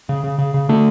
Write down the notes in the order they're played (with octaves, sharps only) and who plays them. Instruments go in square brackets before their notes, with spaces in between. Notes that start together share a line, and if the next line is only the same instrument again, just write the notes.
[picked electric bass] C#3
C#3
C#3
C#3
D3 A3